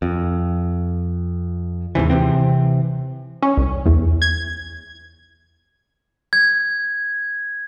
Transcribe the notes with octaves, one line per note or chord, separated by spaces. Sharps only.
F2
D#2 G#2 C3 E3
C3 E3 C4
C#4
C2
E2
G#6
G#6